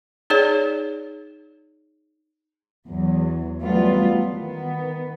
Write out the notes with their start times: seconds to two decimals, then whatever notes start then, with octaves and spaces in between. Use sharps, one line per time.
0.30 D#4 G#4 C#5 D5
2.87 E2 F#3
3.61 E3 F#3 G3 A3 B3 F4
4.27 D#3 B3